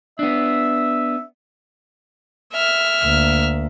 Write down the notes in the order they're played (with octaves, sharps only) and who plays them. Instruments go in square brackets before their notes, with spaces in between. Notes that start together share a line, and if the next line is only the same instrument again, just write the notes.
[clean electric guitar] B3 D4 [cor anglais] E5
[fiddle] E5 F6
[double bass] D2 A#3